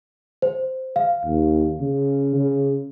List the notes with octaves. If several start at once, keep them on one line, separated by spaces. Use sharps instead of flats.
C5
F5
D#2
C#3
C#3